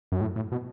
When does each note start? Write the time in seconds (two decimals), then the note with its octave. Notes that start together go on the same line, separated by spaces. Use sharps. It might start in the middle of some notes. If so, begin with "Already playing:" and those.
0.12 F#2
0.21 A2
0.36 A2
0.52 B2